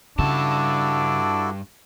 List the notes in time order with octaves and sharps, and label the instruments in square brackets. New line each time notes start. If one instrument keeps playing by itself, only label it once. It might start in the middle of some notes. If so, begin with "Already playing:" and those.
[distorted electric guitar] G2 A5 [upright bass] C#3 [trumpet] D4 [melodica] E4 F#4 A4